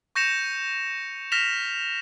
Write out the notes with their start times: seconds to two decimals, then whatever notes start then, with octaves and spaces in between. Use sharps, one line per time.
0.15 C#6 G6 A#6 C#7 E7 F7
1.32 F6 A#6 B6 E7 F7